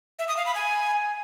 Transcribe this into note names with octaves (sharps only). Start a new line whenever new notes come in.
E5
D#6
F5
B5
G#5